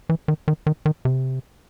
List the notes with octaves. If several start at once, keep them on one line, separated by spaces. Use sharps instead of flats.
E3
D#3
D#3
D#3
D#3
C3